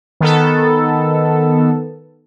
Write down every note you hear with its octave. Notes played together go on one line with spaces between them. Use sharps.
D#3 B3 A4